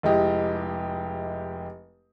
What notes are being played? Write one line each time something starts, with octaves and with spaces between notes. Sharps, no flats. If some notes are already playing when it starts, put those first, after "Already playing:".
F1 G#3 E4 G4 D#5